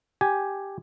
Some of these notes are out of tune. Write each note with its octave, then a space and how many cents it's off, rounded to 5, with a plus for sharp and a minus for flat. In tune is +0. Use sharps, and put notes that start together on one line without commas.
G4 +0 G#5 +0